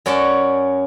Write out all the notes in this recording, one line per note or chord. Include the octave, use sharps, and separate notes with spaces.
F#2 C#4 F#4 D5 F#5 A5